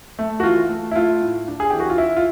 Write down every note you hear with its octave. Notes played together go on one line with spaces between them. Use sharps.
A3
F#4
E3 F4
A3
E4
A3 F4
A2
D4
G#4
E3 G4
F#4
F4
E4
F4